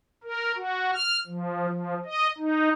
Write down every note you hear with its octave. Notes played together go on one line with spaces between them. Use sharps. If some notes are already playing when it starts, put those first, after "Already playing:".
A#4
F#4
F6
F3
F3
D#5
D#4